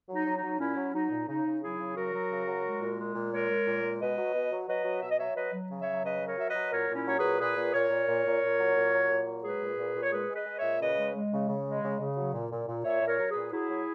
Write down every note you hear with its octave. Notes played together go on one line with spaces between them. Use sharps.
F#3
D#4
F#3
D#4
F#3
A#2 C#4 E4
F#3
F#3 D#4
A#2
C#3 D#4
C#3
F#3 E4 G#4
C#3
F#3 F#4 A#4
F#3
C#3
F#3
G#3
A#2
G#3
A#2
G#3 A#4 C#5
G#3
A#2
G#3
B2 B4 D#5
F#3
B2
F#3
F#3 B4 D#5
F#3
B2 E5
D#5
F#3 C#5 E5
F#3 B4 D#5
F#3
C#3
C#5 E5
F#3
C#3 B4 D#5
F#3
A#4 C#5
F#3 E5
B4 D#5
F#3
A#2 A#4 C#5
A#2
C#4 E4
F#3 C#5
G#4 B4
A#2
A#2 G#4 B4
A#2
A#2 A#4 C#5
A#2
A#2
A#2
A#2
F#3
A#2
F#3
A#2
F#3
G#3 G#4 B4
A#2
A#2
A#2
C#5
G#3 G#4 B4
G#3
B4 D#5
G#3
C#5 E5
A#2
C#3 B4 D#5
G#3
G#3
C#3
C#3
G#3
C#3
C#3
F#3
A#2
A#2
A#2
A#2 C#5 E5
A#2
A#4 C#5
F#3
G#4 B4
A#2
F#3 E4 G#4
F#3